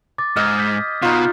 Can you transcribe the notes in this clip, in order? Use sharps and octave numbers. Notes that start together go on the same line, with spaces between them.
D6 A6
G#2 D#5 F6 G#6
F6 G6 B6
B2 D#4 F4